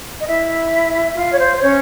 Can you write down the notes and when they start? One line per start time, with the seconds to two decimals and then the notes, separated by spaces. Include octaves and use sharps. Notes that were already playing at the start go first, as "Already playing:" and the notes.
0.21 D#5
0.28 E4 E5
1.16 F4 F5
1.32 C#5
1.39 C5
1.56 C5
1.61 C#4 C#5